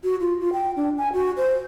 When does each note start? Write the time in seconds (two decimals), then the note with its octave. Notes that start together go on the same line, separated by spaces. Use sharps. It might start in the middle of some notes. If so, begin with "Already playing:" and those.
0.04 F#4
0.20 F4
0.40 F4
0.53 G5
0.76 D4
0.98 G#5
1.13 F#4
1.37 C5